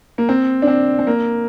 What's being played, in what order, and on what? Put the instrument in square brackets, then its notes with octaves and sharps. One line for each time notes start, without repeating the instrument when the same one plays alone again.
[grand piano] A#3
C4
D4
C4
C4
A#3